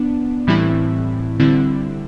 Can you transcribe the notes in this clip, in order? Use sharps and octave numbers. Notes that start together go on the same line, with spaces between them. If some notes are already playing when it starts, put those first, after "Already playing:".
Already playing: B3 D4
A2 E3 G3 C4 E4
D3 G3 C4 E4